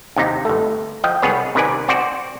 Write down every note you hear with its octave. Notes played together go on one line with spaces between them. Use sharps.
D#2 C3 D#4
G1 A3
F3 D#5 G5
C2 B3 G#4 B4 C#5
C3 D#3 B4 D5 G#5
C4 F#4 C5 D5